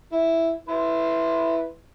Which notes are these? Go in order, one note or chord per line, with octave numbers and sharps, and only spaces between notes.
E4
E4 B4 C6